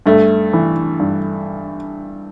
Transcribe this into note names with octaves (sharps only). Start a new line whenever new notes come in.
G2 A3
E3
G2